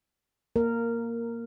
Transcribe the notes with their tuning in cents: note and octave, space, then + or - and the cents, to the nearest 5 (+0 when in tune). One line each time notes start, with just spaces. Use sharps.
A#3 +0 A#4 -10